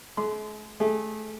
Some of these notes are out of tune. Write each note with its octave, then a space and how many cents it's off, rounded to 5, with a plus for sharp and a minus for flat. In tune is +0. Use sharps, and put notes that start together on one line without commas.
G#3 +45 C6 -20
A3 -25 G#4 -20